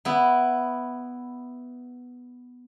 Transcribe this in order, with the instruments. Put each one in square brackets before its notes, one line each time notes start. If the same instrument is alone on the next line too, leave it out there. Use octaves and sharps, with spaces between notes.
[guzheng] B3 E4